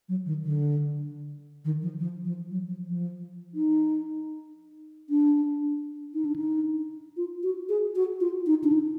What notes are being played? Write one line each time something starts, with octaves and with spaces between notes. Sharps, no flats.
F#3
D#3
D3
D#3
F3
F3
F3
F#3
F3
F3
D#4
D4
D#4
D4
D#4
F4
F#4
G#4
F#4
F4
D#4
D4
D#4